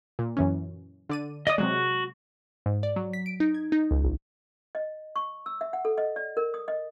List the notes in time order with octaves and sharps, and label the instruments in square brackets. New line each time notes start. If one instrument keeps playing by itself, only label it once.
[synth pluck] A#2
F#2 E3 C#4
D3 D5 D#7
[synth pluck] D5 [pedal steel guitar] D#5 D#6
[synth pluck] C3 F#3 G#3 [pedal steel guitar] F#4
[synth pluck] G#2
D5
F#3
B6
D7
D#4
G#6
D#4
C#2
A#1
[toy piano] D#5
C#6
E6
E5
F#5
A4
D#5
D5
A#4
D#6
D#5